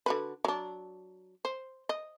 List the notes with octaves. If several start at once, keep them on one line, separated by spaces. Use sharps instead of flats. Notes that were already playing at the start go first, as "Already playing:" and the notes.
D3 F#4 B4
F#3 D4
C5
D#5